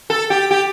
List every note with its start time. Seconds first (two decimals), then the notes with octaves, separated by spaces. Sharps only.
0.10 A4
0.30 G4
0.51 G4